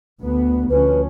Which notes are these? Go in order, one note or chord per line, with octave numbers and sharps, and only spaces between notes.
D2 B3
D2 F3 C#4 B4